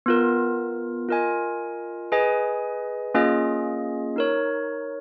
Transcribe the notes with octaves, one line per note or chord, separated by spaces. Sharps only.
B3 F4 A#4
F4 A#4 D#5 G#5
G#4 B4 D#5 G#5
A#3 C#4 F4 G#4 D#5
D#4 A#4 C#5